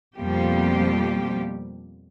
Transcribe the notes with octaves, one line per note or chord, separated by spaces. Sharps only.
F2 B2 F3 G3 A#3 G4